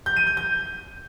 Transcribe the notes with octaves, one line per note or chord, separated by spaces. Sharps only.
G6
D#7
G6
G6